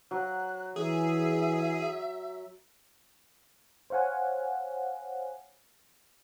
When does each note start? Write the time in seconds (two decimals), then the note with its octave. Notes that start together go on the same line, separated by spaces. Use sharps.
0.11 F#3 F#6
0.76 E3 G#4 E5
3.90 C5 C#5 F5 F#5 G#5